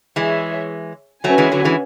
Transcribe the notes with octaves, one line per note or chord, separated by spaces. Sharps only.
E3 G#3 G#4 C#5 E5
F#3 A3 C#4 F#4 B4 E5 G#5
E3 G#3
D3 F#3
E3 G#3